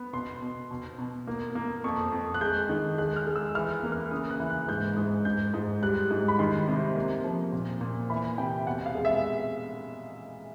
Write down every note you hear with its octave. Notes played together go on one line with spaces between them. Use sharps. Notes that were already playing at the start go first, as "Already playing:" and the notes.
Already playing: B3
B2 C6
B2
B2
B2
A#3
A#3
F2 C#6
F2
F#6
G#3 G6
D#3
G#3 F#6
F6
G#3
E6
E3 F6
F#6
A#3
F6
C#3 D#6
F#6
E3
F#6
G#2 G6
G#2
G#2 G6
G#2
G3 F#6
G#2
B5
D#3 C6
C3
A#3
F3
A#2
A#2
E3 B5
C3 G5
B2 F#5
F5
G#3
E5